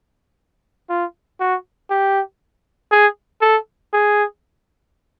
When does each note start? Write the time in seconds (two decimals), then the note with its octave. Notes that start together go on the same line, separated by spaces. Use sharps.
0.90 F4
1.40 F#4
1.90 G4
2.91 G#4
3.42 A4
3.93 G#4